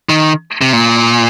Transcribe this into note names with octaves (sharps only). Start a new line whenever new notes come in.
D#3
C3
A#2